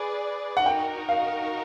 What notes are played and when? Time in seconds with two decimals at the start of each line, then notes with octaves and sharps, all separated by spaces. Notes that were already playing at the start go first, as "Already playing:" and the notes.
Already playing: G#4 B4 D5
0.57 F#5
0.65 D#4 F#4 A#4 G5
1.09 F5